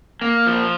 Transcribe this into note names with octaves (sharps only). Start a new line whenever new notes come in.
A#3
F3